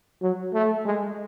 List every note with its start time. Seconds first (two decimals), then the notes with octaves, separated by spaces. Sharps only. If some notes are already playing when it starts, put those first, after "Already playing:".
0.22 F#3
0.54 A3
0.85 G#3